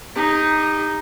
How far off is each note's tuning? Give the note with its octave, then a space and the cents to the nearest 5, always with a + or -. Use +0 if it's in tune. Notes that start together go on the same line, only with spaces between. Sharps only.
D#4 +0 G4 +40